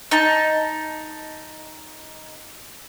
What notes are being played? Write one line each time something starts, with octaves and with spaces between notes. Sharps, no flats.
D#4 A5